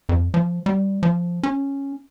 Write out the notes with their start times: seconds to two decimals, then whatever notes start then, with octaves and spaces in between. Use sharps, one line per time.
0.09 F2
0.34 F3
0.66 G3
1.03 F3
1.43 C#4